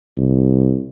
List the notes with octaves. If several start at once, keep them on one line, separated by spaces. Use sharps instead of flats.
C2